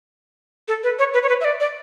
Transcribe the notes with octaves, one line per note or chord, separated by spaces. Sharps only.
A4
B4
C#5
B4
C#5
B4
E5
D5
D5